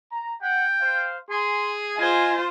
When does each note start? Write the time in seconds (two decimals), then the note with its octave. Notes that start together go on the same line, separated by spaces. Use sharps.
0.12 A#5
0.42 F#5 G5
0.80 C5 F5
1.30 G#4 G#5 C6
1.97 F4 C5 D#5 G#5